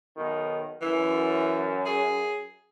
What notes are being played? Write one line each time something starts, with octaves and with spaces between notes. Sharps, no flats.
B1 B2 D#3
F#2 E3
G#4